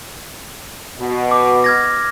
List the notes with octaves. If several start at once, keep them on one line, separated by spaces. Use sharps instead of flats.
B2
D6
F6 G#6 A#6